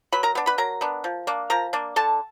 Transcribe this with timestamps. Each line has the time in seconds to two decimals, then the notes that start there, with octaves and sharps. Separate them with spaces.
0.12 F#3 B4 B5
0.23 A#4 A#5
0.35 B3 D4
0.46 B4 B5
0.58 F#3 A#4 A#5
0.81 B3 D4
1.04 F3
1.27 A#3 D4
1.50 F3 A#4 A#5
1.73 A#3 D4
1.96 D3 A4 A5